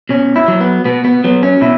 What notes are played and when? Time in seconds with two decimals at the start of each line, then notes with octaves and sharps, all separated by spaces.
0.09 B2 C#4
0.36 E4
0.48 F#3
0.61 B3
0.85 B2 B3
1.04 B3
1.24 F#3 B3
1.43 C#4
1.61 B2 E4